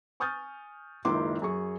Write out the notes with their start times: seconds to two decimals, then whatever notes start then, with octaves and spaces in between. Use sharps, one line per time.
0.20 G#5 C#6 D#6 F6 G6 A6
1.05 F#1 C#2 D#3 E4 C6 D6
1.42 F#2 G#4 C#6